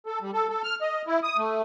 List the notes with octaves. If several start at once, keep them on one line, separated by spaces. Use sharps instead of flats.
A4
G3
A4
A4
F6
D#5
E4
D#6
A3